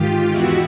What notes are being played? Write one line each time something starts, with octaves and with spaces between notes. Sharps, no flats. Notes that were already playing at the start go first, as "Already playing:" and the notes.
Already playing: G#2 D#3 F4 G4
E2 B2 E4 F#4